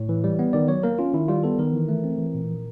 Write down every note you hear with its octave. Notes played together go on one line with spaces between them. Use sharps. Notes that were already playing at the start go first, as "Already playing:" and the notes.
Already playing: A2 C#5
E3
G3
B3
D#3 D5
F#3 C#5
A#3 A#4
C#4 F4
D#3 E4
G3 F4
B3 A4
D#3 A#4
E3
A3
C4
E3
A#2
F3